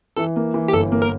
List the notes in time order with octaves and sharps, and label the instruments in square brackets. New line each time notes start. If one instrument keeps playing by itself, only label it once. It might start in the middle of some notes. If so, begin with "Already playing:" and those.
[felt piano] E3 [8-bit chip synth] A4
[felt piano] A#3
E3
[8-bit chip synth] G4
[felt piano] G1 [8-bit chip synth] A4
[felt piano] A#3
[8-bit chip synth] A#4